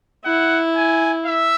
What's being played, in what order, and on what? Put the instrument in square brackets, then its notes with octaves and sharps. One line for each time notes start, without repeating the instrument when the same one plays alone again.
[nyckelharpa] E4 [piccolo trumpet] F#5
[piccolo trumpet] G#5
E5